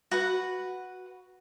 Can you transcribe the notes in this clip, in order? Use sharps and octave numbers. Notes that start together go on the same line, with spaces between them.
F#4 B4 F#5